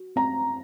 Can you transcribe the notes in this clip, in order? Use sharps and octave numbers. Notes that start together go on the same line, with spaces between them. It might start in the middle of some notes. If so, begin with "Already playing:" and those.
Already playing: F#4
C4 A#5